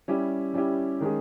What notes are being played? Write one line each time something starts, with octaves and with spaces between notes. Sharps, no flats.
G3 C#4 E4 G4
G3 C#4 E4 G4
D#3 G#3 C#4 G#4